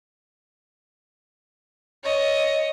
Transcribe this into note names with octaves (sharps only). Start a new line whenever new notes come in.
C#5 D#5